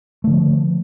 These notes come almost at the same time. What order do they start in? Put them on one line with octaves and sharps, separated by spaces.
A3 D3 F3